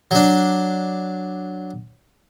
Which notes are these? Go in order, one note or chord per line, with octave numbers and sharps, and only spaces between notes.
F#3 D4